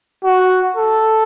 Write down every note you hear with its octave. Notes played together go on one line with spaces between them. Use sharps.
F#4
A4